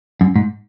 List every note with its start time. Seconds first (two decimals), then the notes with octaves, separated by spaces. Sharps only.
0.21 F#2
0.36 G#2